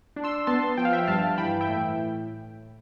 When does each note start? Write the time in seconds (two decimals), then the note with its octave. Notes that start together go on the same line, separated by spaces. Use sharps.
0.16 D4
0.24 C6 E6
0.47 B3 A5 C6
0.77 F3 G5
0.85 F5
0.93 E5 G5
1.07 G2 F5 A5
1.38 E3 G5 B5
1.61 E5 G5
1.69 A2